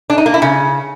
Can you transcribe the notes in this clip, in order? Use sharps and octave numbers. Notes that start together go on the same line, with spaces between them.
D4
D#4
A#3
E4
C#3